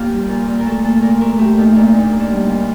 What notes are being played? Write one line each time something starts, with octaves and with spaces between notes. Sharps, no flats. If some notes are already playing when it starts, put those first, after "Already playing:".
Already playing: A#2 A#3 F4 G4
G3
A#2
A#2
A#4
A3 A4
A#2 A4
A#2 A#4
A3 A#4
A3 G4
A#2 D#4
A#2 D4
A#2 D#4
D4
A#3
D4
G3 D#4
A#2